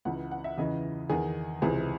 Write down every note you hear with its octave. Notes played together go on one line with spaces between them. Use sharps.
C#2 C#3 E3 F#5
F#5
E5
E2 C#3 E3 D#5
E2 D#3 G#4
C#2 C3 E3 G#4